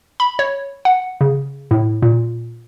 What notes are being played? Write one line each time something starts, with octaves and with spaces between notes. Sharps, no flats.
B5
C#5
F#5
C#3
A2
A#2